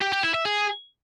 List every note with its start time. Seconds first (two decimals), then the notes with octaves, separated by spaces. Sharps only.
0.01 G4
0.12 G4
0.23 E4
0.34 E5
0.45 G#4